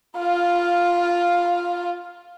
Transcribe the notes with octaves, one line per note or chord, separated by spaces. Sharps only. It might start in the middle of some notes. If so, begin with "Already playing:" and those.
F4 F5